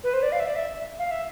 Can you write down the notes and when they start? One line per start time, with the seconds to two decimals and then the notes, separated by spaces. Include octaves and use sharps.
0.04 B4
0.14 C5
0.23 D5
0.32 F5
0.40 E5
0.47 D5
0.55 E5
0.99 F5
1.11 E5